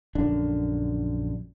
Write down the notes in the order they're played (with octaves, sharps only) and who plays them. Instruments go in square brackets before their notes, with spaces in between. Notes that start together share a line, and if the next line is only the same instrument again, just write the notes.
[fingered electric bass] A#1 F#2 D3 D4